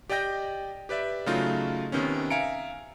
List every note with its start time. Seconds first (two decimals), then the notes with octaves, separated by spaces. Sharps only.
0.09 G4 D5 D#5 G5 G6 A#6
0.89 G4 B4 D5 E5
1.26 C#3 F#3 A3 D#4 F4
1.92 C3 D#3 B3 C#4
2.30 E5 F5 G#5 A#5 C#7 D7